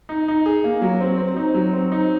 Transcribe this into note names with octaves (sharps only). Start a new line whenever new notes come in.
D#4
D#4
G#4
A#3
F#3
C4
C4
D#4
F#3
C4
D#4